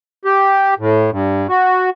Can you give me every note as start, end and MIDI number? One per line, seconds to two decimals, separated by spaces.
0.25 0.74 67
0.79 1.10 45
1.12 1.47 43
1.49 1.90 66